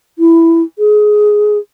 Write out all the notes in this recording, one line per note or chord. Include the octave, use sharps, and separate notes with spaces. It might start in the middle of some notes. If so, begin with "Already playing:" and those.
E4
G#4